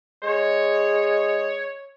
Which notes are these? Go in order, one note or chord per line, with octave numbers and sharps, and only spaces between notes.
G#3 C#5